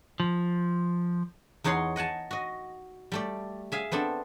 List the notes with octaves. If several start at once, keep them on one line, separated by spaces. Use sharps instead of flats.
F3
E2 D#4 C#5 F#5 C6
D#5 F#5 G#5 A5
F#4 D#5
G3 A3 D5
G#4 E5 F5 G#5
B3 C4 D4 A4